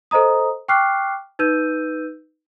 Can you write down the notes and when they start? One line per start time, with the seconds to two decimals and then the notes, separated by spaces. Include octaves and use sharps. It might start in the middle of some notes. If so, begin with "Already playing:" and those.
0.11 A4 C5 D#5 A#5 D#6
0.68 G5 C#6 D6 F6 F#6 C7
1.39 D#4 B4 E6 G6 D#7